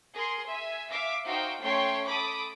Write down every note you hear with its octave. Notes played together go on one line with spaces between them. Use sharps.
G#4 A#4 G#5 C6
E5 G#5
E5 F5 D6
D#4 F#4 C5 F5 G5
A3 C#4 C#5 G5 C6 C7
A4 B5 D6 D#6